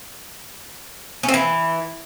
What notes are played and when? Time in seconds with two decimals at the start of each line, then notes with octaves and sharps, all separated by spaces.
1.23 C#4
1.29 C4
1.34 E3